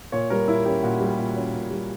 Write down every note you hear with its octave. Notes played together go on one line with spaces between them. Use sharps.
A#2 C#5
G3 A#4
A#2 E4
C#4 G4
A#2 F#4
G3
G4
A#2
F#4
C#4
A#2
G3